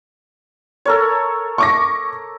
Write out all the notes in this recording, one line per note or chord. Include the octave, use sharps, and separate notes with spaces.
A4 A#4 C#5
C#6 D6 A#6